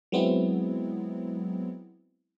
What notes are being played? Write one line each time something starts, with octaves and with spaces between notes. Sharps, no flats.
F#3 G#3 B3 C4 E4